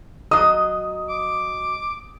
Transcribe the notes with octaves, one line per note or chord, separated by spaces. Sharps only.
F#3 D#5 D#6
D6